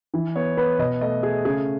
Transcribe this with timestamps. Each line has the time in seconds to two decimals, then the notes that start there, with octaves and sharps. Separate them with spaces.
0.14 E3
0.36 B3 C#5
0.57 B3 B4
0.79 B2 D#5
1.01 A3 D#5
1.23 A3 G#4
1.45 C#3 G#4